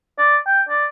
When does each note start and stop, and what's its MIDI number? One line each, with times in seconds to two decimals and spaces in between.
0.18 0.37 74
0.47 0.62 79
0.69 0.85 74